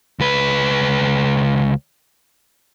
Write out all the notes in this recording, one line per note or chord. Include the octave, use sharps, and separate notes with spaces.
C#2 B4